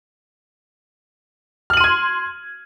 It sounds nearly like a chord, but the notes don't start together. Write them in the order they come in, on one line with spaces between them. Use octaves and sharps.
F6 F#7 D#7 C6 G#6